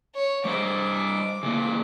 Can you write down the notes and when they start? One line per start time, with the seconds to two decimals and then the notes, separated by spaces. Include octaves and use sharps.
0.15 C#5
0.45 G3 C5 D#5 D6
1.43 C#3 E3 A#3